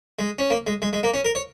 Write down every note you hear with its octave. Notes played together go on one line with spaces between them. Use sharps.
G#3
C#4
A#3
G#3
G#3
G#3
A#3
C#4
A#4
C#5